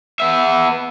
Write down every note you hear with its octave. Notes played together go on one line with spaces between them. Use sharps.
B3 E5